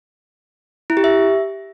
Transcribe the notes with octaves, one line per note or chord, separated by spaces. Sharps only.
E4
G4
E5